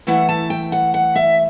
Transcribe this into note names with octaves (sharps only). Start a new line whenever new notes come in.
E3 A3 E4 F#5
A5
G5
F#5
F#5
E5